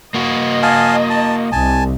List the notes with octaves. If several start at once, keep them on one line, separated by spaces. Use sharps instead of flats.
A#3 F#4 D#5
F5 G#5 A5
A5
C2 G#5 A5